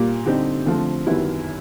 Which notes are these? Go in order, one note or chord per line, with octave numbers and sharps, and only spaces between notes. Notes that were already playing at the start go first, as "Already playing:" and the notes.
Already playing: A#2 G3 A#3
D3 G3 C4 D#4 G4
D3 F3 A3 C4
F#2 D#3 G3 B3 E4